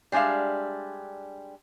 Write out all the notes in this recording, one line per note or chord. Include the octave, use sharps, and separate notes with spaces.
G3 G#3 D4 E5 F5